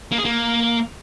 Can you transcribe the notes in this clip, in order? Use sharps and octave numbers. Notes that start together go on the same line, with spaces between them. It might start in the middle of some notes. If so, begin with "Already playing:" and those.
A#3
G#4
A#3